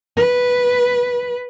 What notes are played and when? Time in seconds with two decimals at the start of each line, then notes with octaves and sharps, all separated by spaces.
0.17 B4